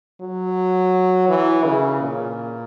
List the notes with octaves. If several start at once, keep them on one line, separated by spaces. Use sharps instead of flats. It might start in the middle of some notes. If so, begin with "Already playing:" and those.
F#3
E3
C#3
A#2